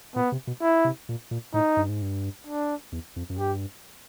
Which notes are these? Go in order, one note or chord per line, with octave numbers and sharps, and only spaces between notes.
A#2 B3
C3
B2
E4
C3
A#2
A#2
A2 D#4
G2
G#2
G2
D4
E2
F2
F#2
G2 G4